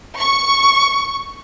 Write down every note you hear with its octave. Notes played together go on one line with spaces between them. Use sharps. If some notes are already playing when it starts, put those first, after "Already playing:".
C#6